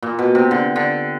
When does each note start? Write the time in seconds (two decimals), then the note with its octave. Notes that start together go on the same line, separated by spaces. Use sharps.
0.03 A#2
0.19 B2
0.35 C3
0.51 D3
0.76 D3